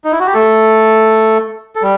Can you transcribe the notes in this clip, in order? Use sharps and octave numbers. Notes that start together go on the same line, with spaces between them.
D#4
E4
F#4
G4
A3 A4
A4
G3